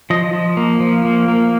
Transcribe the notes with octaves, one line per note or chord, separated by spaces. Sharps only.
F3 D#5
F3
A#3
F3
A#3
A#3